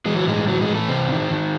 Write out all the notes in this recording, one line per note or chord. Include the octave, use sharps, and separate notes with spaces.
E3 G#3
F#3
A2 G#3
E3 F#3
G#3
E3
A3
C3 C4
D#3
D#3